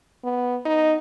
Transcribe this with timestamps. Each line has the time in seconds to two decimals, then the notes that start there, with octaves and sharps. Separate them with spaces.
0.24 B3
0.65 D#4